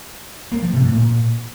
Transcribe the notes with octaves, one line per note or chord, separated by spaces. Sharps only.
A#3
F3
C3
A2
A#2